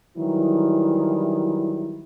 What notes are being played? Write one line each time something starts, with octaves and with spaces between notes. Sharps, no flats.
D#3 E3 F#3 G3 E4